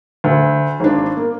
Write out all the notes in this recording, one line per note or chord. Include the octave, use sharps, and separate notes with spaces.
D2
G#1 D4
A#3